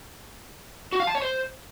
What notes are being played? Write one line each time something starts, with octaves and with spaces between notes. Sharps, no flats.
F#4
F5
A5
C#5
C5